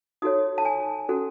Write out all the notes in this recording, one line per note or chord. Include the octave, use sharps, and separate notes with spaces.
D#4 F#4 A4 C#5 D#6
A5
G#5
C#4 F#4 A4